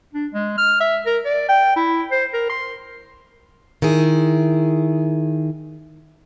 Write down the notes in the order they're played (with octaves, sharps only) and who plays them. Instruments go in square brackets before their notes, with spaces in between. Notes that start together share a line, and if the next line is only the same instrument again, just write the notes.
[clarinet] D4
G#3
F6
E5
A#4
D5
G5
E4
C5
A#4
C6
[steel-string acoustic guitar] D#3 E4 G#4